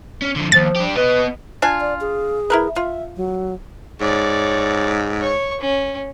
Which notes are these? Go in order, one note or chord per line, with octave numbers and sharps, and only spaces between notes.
C#4
D3 F3
D#2 G#2 F3 A6
D4 G4
B3 B4 D#5
D4 F4 G#5
D5
G#4
E4 A#4 B4
F4 E5
F#3
G#2 C#5 D5
C#5 C#6
C#4